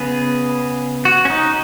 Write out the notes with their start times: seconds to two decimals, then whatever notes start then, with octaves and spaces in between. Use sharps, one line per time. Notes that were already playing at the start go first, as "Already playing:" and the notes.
Already playing: C#3 B3 G#4
1.05 F#4
1.25 C#4
1.30 D#4